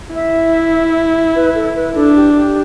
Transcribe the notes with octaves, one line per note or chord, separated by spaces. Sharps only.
E4 E5
B4
A4
B4
D4 A4
G4
G4